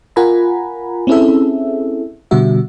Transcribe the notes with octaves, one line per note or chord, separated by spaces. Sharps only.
F4 A#4 F#5 G#5 A#5 B5
C4 C#4 E4 G#4 A4 E5
B2 D3 G3 F#4 E5